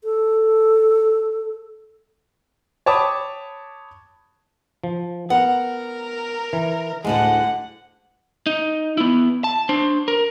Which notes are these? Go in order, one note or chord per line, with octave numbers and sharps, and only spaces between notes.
A4
C#5 G5 A5 B5 D6 D#6
F3
B3 A#4 F#5
E3
D2 A2 D3 G#3 F#5
D#4
B3 E4
A5
D4 C5
A#4